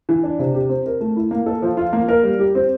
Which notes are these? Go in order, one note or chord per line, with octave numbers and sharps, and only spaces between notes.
E3
D4
C3
G4
C4
A#4
A3
E4
A#3
A4
F3
F4
A#3
A#4
G3
G4
C4